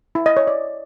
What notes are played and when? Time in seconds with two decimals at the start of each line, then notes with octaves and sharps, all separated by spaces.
0.15 E4
0.26 D#5
0.37 C#5
0.47 D5